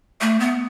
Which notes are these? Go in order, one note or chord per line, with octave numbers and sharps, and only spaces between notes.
A3
B3